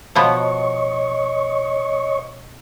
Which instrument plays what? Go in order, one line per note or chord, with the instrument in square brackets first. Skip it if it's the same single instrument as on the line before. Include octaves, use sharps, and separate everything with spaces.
[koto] B2 F3 B3 [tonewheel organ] C#5 D#5 C#6